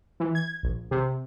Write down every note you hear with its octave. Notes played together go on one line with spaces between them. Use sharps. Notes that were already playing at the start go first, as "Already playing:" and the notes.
E3
G#6
A#1
C3